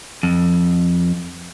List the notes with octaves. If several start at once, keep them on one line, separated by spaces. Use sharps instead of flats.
F2